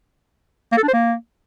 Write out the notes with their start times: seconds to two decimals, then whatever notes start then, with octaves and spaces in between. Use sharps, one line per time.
0.72 A#3
0.78 A4
0.83 D4
0.88 C5
0.93 A#3